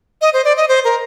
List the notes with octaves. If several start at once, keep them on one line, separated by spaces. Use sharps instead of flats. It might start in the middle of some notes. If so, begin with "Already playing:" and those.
D#5
C5
D5
D#5
C5
A#4